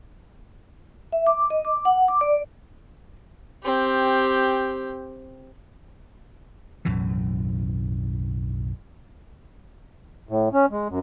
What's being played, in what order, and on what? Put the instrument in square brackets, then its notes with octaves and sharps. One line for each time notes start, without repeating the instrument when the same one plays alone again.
[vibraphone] E5
D6
D#5
D6
F#5
D6
D5
[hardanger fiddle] C4 G4
[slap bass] B1 F#2 A2 E3
[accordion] A2
C#4
G#3
F#2